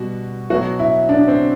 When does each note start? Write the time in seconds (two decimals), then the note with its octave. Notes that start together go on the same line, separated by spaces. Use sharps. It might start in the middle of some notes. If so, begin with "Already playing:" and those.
Already playing: B2 G3 F#4
0.50 B2 F#3 F#4
0.79 E4
1.09 D4
1.28 C4